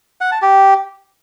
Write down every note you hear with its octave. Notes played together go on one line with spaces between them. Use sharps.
F#5
A5
G4